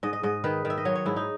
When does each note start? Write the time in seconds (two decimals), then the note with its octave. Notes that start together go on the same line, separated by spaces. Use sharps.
0.03 G#2 D#5
0.13 D#5
0.23 G#2 D#5
0.44 D#3 B4
0.65 D#3
0.70 E5
0.77 D#5
0.85 F#3 C#5
0.95 C#5
1.05 G#2 E4
1.16 D#4